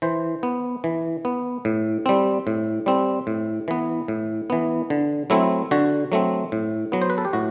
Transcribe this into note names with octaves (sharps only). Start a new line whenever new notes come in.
E3 C5
B3
E3
B3
A2
G3 C4
A2
G3 C4
A2
E3 B3
A2
E3 B3
D3
F#3 A3 C4 E4
D3 F#4
F#3 A3 C4
A2
F#3 B3
C5
B4
A4
G4
A2 F#4